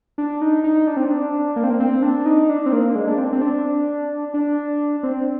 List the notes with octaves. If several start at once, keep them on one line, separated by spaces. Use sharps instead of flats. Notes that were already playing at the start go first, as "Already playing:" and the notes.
D4
D#4
D#4
D4
C4
D4
A#3
C4
A#3
C4
D4
D#4
D4
C4
A#3
G#3
D4
C4
C4
D4
D4
C4